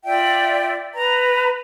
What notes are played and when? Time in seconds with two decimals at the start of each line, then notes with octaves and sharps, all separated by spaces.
0.04 F4 D5 E5 G5
0.93 B4 A#5